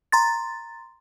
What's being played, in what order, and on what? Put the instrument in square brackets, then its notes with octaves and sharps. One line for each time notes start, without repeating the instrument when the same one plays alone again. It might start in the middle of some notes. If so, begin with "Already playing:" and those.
[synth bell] A#5 C6 A6